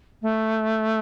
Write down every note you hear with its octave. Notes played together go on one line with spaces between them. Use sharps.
A3